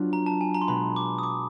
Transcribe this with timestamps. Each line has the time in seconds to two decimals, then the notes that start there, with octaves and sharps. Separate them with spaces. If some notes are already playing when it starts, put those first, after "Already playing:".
Already playing: F#3 B3 D4 F4
0.13 A#5
0.26 A5
0.41 G#5
0.54 A#5
0.62 C6
0.67 B2 G#3 B3 B5
0.96 D6
1.19 D#6
1.23 D6